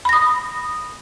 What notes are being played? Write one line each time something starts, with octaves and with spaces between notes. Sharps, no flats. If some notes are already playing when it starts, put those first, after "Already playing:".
B5 D#6 A#6